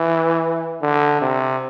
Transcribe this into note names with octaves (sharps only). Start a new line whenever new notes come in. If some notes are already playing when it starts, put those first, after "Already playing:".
Already playing: E3
D3
C3